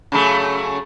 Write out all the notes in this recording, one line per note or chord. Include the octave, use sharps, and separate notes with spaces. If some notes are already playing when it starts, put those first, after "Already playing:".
C#3 F#3 A3